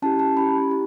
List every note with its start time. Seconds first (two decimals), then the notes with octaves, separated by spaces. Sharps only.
0.02 C#4 E4 G4 A5
0.19 A5
0.36 C#4 E4 G4 B5
0.71 E4 G4